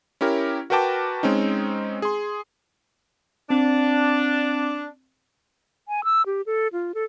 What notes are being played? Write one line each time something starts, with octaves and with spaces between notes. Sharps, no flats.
C#4 E4 G4 A#4
F#4 A#4 B4 G5 A5 D6
G#3 C4 C#4 D#4
G#4 C6
C4 D4
G#5
E6
G4
A4
F4
A4